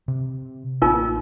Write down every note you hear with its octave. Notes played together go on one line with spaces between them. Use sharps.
C3
A1 A#3 D#4 F4 A#4